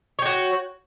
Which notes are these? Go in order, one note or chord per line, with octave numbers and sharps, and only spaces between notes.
F#4 C#5 G5